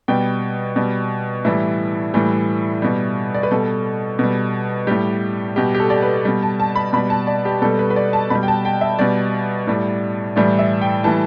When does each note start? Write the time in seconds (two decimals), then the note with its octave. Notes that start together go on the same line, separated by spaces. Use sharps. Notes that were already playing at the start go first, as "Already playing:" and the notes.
0.08 B2 G3 G5
0.76 B2 G3
1.45 A2 E3 G3 E4
2.14 A2 E3 G3
2.82 B2 G3
3.34 D5
3.43 B4
3.51 B2 G3 A4
4.19 B2 G3
4.87 A2 G3 G4
5.56 B2 G3 G4
5.74 G4
5.80 A4
5.90 D5
6.02 B4
6.25 B2 G3
6.42 A5
6.60 A5
6.76 B5
6.93 B2 G3 B5
7.10 A5
7.27 D5
7.45 G4
7.62 B2 G3 A4
7.79 B4
7.90 B4
7.96 D5
8.13 A5
8.30 B2 G3 B5
8.43 G5
8.48 A5
8.65 G5
8.81 E5
8.99 B2 G3 D5
9.67 A2 G3
10.36 A2 E3 G3 D5
10.59 E5
10.81 G5
11.04 A2 E3 G3 A5